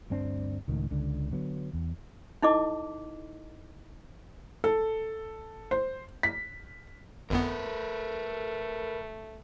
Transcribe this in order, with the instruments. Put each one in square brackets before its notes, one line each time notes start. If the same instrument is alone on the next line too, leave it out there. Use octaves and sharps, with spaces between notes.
[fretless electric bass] D2 G2 C4 D4
C#2 A2 D#3
C#2 D3
D3 F#3 B3
E2
[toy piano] D#4 E4 A4 D#5 D6
[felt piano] A4
C5
B6
[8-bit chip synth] G1 F2 B3 [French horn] A3 [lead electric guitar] A#4 B4